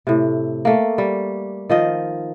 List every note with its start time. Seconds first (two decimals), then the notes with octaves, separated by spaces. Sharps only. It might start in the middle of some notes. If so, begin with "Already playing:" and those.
0.07 A2 C3
0.65 A3 A#3
0.98 G3
1.70 D#3 F3 D#5